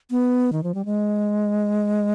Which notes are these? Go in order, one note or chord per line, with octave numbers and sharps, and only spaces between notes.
B3
D#3
F3
G3
G#3